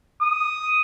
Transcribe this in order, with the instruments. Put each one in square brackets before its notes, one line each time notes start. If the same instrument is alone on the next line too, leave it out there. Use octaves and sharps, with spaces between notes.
[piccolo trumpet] D#6